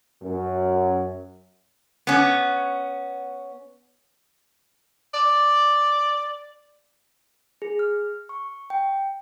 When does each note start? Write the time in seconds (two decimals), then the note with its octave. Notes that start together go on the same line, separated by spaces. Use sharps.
0.21 F#2
2.07 B3 C#4
5.14 D5
7.62 G#4
7.79 F6
8.29 C#6
8.70 G5